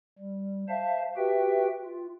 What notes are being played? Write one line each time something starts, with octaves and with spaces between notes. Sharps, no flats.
G3
C5 E5 F5 A5
F#4 G4 B4 E5 G5
F4